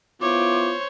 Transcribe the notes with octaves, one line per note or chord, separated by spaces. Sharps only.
B3 E4 F4 C5 C#5 D6